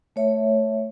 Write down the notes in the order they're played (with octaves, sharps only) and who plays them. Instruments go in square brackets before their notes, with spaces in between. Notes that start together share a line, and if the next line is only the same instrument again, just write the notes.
[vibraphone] A3 C#5 E5